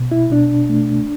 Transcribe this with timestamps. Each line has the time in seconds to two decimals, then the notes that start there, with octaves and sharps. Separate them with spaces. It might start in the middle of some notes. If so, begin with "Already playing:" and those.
Already playing: B2
0.12 E4
0.31 B2 D4
0.69 A3